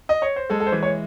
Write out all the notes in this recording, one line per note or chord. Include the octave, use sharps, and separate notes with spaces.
D#5
C#5
C5
G#3 A4
A4
C5
E3
C#5